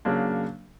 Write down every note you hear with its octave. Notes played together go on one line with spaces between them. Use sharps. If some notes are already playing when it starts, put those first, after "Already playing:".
C#3 F#3 A#3 D4